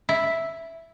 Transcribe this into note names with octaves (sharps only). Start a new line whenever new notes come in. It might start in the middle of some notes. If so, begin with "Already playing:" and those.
E4